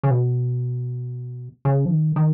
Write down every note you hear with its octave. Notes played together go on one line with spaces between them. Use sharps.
C#3
B2
C#3
F3
D#3
D#3